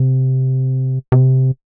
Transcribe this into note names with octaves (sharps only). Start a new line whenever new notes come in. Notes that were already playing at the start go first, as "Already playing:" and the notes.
Already playing: C3
C3